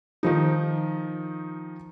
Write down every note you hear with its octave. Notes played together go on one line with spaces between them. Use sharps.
D#3 F3 D#4